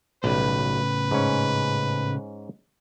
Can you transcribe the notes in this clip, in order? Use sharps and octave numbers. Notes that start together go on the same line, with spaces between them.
B1 A2 C#3 G3 B4
G#2 C#4